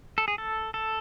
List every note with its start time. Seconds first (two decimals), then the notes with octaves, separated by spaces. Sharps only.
0.18 A4
0.28 G#4
0.38 A4
0.74 A4